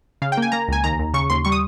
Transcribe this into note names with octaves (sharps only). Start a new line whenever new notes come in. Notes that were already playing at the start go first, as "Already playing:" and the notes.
C#3 F5
G5
A#3 G#5
A#3 A#5
C#2 G#5
D#2 A#5
D#2
C#3 C#6
D#2 C6
G3 C#6
D#6